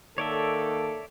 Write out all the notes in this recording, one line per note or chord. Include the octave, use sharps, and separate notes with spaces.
D#3 A#3 A4 C#5 D5 E5